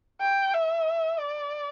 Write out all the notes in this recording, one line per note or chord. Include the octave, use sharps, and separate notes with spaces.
G5
E5
D5